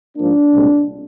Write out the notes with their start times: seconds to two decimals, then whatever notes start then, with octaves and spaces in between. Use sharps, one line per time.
0.18 G#2 F3 A#3 D4
0.53 C2 A#2 G#3 C4